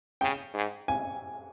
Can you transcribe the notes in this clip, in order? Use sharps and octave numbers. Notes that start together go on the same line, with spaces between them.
C#3 G5
G#2
G#5